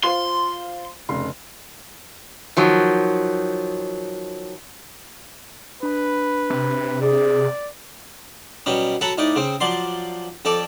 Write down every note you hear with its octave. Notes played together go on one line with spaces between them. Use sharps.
F4 C5 F5 C6
F1 C#3 C6
D#3 F3 F#3
D4 B4 B5
C3
G#4 D5
B2 F#3 G3 C#4
F#3 A4 F#5 A#5 B5
A2 D#4 D5
C#3 C4
F3 F#3 D5 C6
F2 A4 D5